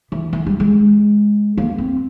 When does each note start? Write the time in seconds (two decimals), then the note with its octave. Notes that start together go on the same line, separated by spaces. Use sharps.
0.12 E3
0.33 E3
0.46 G3
0.60 G#3
1.57 A#3
1.78 C4